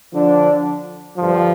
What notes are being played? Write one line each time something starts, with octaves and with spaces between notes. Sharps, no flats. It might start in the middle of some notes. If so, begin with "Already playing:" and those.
D3 F3 D4
G2 D3 F3